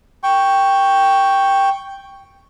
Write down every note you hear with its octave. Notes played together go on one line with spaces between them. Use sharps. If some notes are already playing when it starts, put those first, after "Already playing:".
G5 C#6